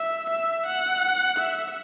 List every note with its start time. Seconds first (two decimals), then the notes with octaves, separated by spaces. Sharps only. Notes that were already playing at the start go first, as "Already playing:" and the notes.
Already playing: E5
0.30 E5
0.66 F#5
1.38 E5